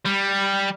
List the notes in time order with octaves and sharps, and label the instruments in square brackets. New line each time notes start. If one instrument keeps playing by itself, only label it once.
[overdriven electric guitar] G3